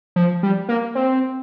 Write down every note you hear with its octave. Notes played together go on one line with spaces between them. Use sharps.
F3
G3
A#3
C4